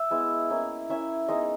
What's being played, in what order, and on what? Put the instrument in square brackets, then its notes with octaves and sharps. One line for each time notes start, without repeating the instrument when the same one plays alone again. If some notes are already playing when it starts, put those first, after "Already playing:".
Already playing: [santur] E5
G#3 B3 E4
A#3 C#4 E4
A#3 C#4 E4 E5
G#3 B3 D#4 D#5